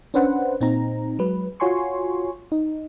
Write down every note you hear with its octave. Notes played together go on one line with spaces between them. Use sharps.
C#4 D4 B4 C5 F#5
A#2 C4 D#4 A#5
F#3 G#3 B4
F4 F#4 C#5 G#5 C6 C#6
D#4